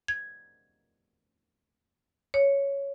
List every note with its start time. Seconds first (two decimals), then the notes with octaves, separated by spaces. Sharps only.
0.08 G#6
2.34 C#5